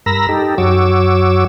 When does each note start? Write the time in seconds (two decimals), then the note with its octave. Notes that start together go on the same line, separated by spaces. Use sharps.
0.06 G2 A#4 A#5 B5 E6 A#6
0.29 D#4 G4 A4
0.58 F#2 F#3 F#4 C#5 D6 E6